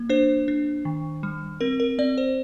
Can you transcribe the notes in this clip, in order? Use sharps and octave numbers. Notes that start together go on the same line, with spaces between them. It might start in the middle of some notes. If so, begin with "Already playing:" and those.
Already playing: A#3
D4 C5
D4
D#3
G3
C4 A#4
A#4
C4 D5
C5